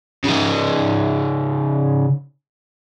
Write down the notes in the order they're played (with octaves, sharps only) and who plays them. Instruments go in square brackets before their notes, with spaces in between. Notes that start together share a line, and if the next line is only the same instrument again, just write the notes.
[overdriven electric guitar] C#3 D#4